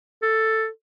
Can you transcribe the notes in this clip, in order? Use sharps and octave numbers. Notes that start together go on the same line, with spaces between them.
A4